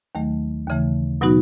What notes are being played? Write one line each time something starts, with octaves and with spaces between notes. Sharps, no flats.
D#2 D#3 F#3 A3
D#2 C#3 E3 A3
B2 F#3 B3 D#4 F#4